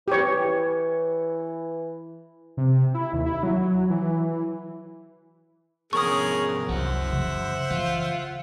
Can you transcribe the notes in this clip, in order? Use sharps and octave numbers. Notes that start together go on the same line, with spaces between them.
E3 G4 C#5
C3
E4
D#2
E4
F#3
E3
D3 F3 B3 C#4 G#4 A#4 C#6 D#6
C2 F#2 E4 F#4 C5 E5 F#5
C#3 E3
C#3 E3 F4